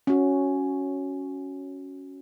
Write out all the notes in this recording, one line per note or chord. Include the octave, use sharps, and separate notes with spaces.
C#4 F#4